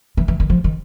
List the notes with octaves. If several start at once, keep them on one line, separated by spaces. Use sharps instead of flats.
E3
E3
D#3
F3
D#3